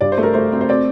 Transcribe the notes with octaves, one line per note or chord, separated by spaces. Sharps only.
G2 D5
C5
A3
A#4
A3 C5
C4
C5
C4 D5